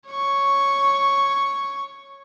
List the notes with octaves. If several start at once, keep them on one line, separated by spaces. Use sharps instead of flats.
C#5 C#6